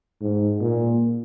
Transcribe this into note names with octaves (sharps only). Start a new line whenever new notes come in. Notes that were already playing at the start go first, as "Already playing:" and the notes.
G#2
A#2